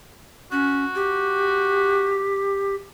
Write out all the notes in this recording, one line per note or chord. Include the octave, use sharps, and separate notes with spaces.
C#4 F#4
G4